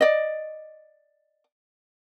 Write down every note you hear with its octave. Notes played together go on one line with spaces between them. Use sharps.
D5 D#5